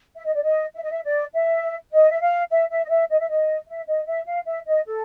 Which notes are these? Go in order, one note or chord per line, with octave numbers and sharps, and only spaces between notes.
E5
D#5
D5
D#5
E5
D#5
E5
D5
E5
D#5
E5
F5
E5
E5
D#5
E5
D#5
E5
D#5
E5
D#5
E5
F5
E5
D#5
A4